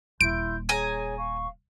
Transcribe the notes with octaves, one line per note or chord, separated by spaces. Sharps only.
D#1 E4 C6 G6 D7
G#4 C#5 G#5 A#5
F5 C#6